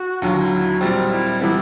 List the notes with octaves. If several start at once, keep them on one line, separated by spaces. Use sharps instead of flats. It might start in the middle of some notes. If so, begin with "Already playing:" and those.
Already playing: F#4
D#2 D3 F#3 F4
E4
A#2 G3 C4 D4
D#4
E4
C3 E3 G3 B3 E4